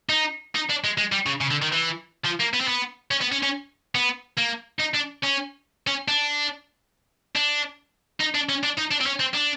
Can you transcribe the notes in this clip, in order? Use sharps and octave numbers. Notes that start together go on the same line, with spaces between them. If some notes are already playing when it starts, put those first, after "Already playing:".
D#4
D#4
D4
G#3
G#3
G3
C#3
C#3
D3
D#3
E3
F3
A#3
B3
C4
B3
C#4
B3
C#4
C#4
B3
A#3
D#4
D4
C#4
C#4
D4
D4
D#4
D4
C#4
D4
D#4
D4
C4
C#4
C4
D4